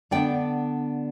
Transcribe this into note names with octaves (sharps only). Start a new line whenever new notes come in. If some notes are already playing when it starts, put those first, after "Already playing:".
D3 B3 D4 D5 G5